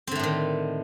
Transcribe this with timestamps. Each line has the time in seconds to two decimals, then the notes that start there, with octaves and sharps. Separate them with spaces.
0.07 C4
0.11 D3
0.15 A3
0.19 A2
0.23 D#3